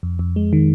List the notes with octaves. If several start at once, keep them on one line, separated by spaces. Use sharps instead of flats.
F2
F2
G#3
D#3